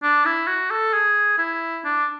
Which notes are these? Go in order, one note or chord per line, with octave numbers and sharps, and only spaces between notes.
D4
E4
F#4
A4
G#4
E4
D4